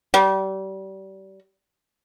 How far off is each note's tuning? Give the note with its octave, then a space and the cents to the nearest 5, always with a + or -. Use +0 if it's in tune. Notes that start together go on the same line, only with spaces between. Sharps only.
G3 -30